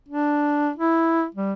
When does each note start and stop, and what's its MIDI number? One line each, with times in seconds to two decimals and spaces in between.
0.09 0.70 62
0.76 1.26 64
1.35 1.53 55